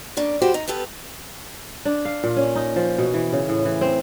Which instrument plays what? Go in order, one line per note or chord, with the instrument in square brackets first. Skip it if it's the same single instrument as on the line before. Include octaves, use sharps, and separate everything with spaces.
[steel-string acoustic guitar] A#3 C#4 D4
G3 F#4 G4 C5
D#4
B3 G4 A4 B4
[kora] D4
F5
A#2
C#4
D#4
F3
B2
E3
C#3
A2
E3
C4